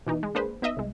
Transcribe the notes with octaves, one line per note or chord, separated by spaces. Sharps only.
B2 E3 D#4
G#3
A#3 D4 G#4 B4 C5
B3 D#4 D#5 E5
C2 G#3